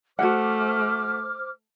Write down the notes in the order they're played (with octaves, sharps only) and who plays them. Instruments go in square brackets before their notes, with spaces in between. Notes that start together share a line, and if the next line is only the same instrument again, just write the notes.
[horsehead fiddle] A3 [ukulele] F#4 F#5 [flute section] C5 D6 F6